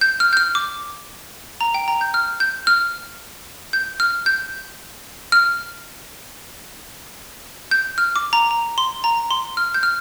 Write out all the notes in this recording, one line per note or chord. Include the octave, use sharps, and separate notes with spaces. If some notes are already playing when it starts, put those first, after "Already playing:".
G6
F6
G6
F6
D6
A#5
G5
A#5
G6
F6
G6
F6
G6
F6
G6
F6
G6
F6
D6
A#5
A#5
C6
A#5
C6
F6
G6
F6